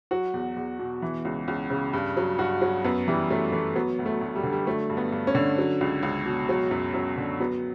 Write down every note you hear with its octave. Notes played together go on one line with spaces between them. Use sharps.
F#3 F#4
E2
E2
B2
E3
C#2
C#2
C#3
G2
F#3
G2 F#4
F#3
F#2 B3
E3 G3
F#2 A3
E3 A3
F#3 B3
D2
A3
D2
G3
D3
G3
F#3 A3
G2
B3
G2
C#4
D3
F#3
C#2
C#2
B2
F#3
F#2
F#2
D3
F#3 B3